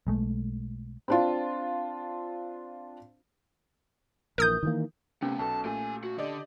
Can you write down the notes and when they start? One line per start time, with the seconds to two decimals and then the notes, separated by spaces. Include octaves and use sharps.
0.07 B1 G#3 A3
1.08 C4 D4 F4
4.38 A#1 E3 A#4 D#6 G6
4.63 D#3 E3 A#3
5.22 C3 A3 B3 C#4
5.39 B1 B2 A4 A5
5.65 A#2 A3 G4 G#5
6.04 F#4
6.18 D3 G4 D5 D#5